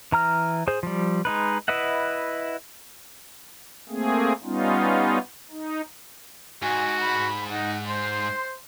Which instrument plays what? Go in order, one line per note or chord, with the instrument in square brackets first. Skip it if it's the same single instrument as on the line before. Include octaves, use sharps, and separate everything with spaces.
[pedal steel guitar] E3 A#5 F6
G#4 C5
F3 G3
G#3 D#4 B4
E4 B4 D#5 E5 F#5
[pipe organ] A3 A#3 C4 G#4
G3 B3 C#4 D#4 F4
D#4
[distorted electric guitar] G#2 [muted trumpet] F#4 [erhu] G#5
[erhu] B5
[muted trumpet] D#4 [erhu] F#5
[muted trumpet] C5 [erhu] C6